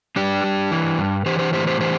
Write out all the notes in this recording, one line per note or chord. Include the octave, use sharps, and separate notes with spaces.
G3 D4 G4
G3
E3
G2
E3 G4 C5
G4 C5
A2 G4 C5
G4 C5
E3 G4 C5